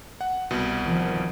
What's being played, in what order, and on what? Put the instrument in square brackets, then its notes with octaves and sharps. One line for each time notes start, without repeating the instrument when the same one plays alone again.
[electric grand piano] F#5
C2 B2
[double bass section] D#3 F3